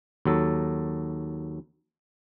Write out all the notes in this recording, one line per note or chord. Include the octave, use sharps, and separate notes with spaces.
D#2 F#3 A4